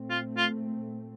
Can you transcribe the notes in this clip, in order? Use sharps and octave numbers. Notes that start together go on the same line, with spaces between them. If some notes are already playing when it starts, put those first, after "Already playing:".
Already playing: A#2 A3 C4
F4
F4